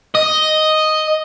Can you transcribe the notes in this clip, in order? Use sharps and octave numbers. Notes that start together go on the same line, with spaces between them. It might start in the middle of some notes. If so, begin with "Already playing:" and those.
D#5